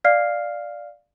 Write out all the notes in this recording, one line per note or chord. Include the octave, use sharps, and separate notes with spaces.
D5 F5 F6 C7